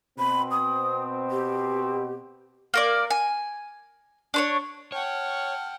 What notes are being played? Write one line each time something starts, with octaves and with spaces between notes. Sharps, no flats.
B2 C4 B5
D#6
G4
A#3 A#4 D5
G#5
D4 C5 C#5
C#5 F#5 G5 A5 F6